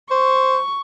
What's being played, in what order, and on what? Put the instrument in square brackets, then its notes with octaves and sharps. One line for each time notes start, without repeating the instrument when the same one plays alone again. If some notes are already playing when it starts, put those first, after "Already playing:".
[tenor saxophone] C5 [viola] C#6